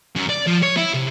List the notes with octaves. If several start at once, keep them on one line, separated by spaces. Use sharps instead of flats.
F#2
D5
F3
C#5
E4
C3